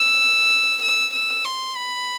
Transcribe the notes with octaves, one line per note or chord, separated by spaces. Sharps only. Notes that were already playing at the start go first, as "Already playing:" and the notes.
Already playing: E6
E6
E6
C6
B5